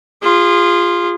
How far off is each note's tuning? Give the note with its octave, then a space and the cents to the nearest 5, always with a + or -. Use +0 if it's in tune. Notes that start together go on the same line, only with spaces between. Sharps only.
F4 +0 G#4 -30